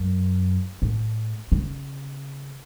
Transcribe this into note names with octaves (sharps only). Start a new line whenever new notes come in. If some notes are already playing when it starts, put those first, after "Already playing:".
Already playing: F#2
A2
C#3